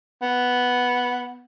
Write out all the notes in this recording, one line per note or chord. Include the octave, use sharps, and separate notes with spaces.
B3